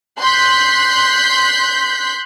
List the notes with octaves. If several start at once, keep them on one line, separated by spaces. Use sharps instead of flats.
C6 F#6 G6 B6